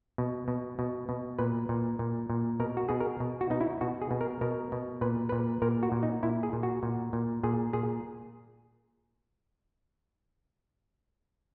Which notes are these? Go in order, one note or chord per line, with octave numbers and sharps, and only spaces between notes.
B2
B2
B2
B2
A#2 B4
A#2
A#2
A#2
B2 A#4
F#4
B2 G#4
A#4
B2
F#4
B2 D#4
E4
B2 F#4
G#4
B2
A#4
B2 A#4
B2
A#2 B4
A#2 B4
A#2 A#4
F#4
A#2
D#4
A#2 E4
G#4
A#2
F#4
A#2
A#2
A#2 G#4
A#2 G#4